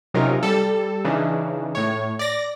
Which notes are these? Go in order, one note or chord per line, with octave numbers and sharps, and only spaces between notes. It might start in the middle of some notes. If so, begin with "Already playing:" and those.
C3 F#3 C#4 D#4 F4 A#4
G3 A4
C#3 E3 D4 D#4
A2 C#5
D5 A#6